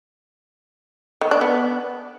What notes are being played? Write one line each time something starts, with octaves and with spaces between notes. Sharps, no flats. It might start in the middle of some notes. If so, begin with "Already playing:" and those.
D#3
D4
B3